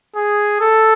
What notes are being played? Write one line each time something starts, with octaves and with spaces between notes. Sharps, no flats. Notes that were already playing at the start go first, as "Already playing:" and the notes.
G#4
A4